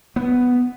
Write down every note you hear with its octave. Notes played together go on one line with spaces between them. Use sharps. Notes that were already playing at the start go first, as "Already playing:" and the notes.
B3